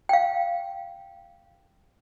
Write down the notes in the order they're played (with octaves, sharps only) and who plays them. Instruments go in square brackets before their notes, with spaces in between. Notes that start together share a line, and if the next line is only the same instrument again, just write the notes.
[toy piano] F5 G5